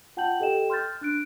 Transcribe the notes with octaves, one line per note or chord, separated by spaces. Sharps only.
F4 F#5 G5 A5 G6 F#7
G4 A4 D#5 G5 E7
C6 F6 G6 A6
D4 F#6 D7